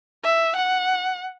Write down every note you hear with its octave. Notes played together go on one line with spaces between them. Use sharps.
E5
F#5